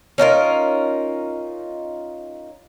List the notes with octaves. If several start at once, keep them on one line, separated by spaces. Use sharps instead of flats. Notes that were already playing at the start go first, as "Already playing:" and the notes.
C#4 D#4 F4 A#4